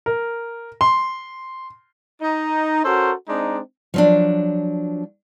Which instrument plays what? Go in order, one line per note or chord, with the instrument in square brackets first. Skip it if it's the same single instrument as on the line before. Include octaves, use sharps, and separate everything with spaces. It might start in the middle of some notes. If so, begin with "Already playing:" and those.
[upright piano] A#4
C6
[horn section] D#4
C#4 F#4 A4 A#4 C5
G#3 C4 D4 D#4
[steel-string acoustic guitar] F3 F#3 D4